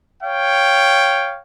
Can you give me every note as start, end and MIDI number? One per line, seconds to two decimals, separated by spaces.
0.22 1.40 73
0.22 1.40 77
0.22 1.40 79